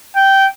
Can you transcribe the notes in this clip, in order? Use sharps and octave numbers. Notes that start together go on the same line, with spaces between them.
G5